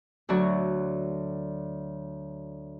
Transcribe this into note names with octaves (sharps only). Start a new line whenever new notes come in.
D2 D3 F#3 D4 F#4 C#6